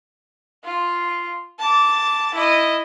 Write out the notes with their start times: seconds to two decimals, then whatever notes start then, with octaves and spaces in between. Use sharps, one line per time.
0.64 F4
1.59 A5 D6
2.35 E4 D#5